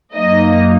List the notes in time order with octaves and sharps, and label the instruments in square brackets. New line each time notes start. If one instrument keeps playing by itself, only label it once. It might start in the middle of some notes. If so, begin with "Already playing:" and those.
[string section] F#2 F#3 A#3 D#4 D#5